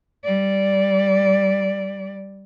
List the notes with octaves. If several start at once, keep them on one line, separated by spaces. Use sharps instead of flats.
G3 D5